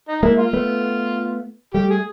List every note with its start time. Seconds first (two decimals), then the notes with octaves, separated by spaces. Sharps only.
0.08 D#4
0.23 G#3 A#3 E4
0.38 F4
0.53 A3 B3
1.74 G3 A3 G4
1.91 G#4